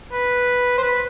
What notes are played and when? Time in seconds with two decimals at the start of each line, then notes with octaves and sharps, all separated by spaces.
0.13 B4
0.77 C5
0.83 B4